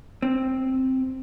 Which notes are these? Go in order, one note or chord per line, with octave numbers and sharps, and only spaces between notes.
C4